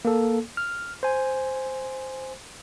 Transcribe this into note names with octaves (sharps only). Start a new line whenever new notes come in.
A#3 A4
F6
C5 G#5